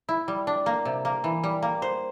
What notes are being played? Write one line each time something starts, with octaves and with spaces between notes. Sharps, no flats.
E4
G3
D4
A#3
C3
A#3
E3
G3
A#3
C5